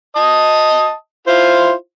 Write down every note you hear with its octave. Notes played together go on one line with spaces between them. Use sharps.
D#5 A5 D#6
E4 F4 C5